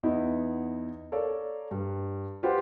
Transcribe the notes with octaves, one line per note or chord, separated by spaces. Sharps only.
E2 B3 D#4 E4
A4 A#4 C#5 D5 F5
G2
F4 G4 B4 C5 F#5